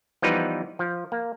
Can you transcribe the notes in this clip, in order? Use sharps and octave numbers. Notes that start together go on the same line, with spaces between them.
E3 F3 G3 B3 D#4 B4
F3
A#3